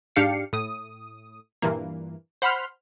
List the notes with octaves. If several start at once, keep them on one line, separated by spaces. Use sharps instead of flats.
G#2 D4 G4 F5 C7 C#7
A2 D#6
G2 A#2 E3 A#3
C5 F#5 B5 C6 F6